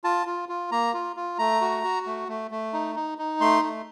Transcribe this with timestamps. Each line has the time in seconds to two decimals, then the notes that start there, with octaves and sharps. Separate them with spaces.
0.04 F4 A5
0.27 F4
0.49 F4
0.71 A#3 A#5
0.94 F4
1.16 F4
1.39 A3 A#5
1.61 F#4
1.83 F#4
2.06 A3
2.28 A3
2.51 A3
2.73 D#4
2.96 D#4
3.18 D#4
3.40 A3 C6
3.63 A3